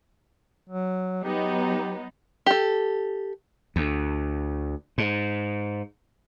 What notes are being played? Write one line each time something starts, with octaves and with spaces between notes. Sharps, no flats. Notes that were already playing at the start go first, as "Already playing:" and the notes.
F#3
F#3 B3 D#4 G4
G4 A4
D2
G#2